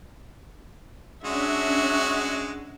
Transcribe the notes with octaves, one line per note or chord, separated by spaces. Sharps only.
G#3 C#4 D4 F#4 E5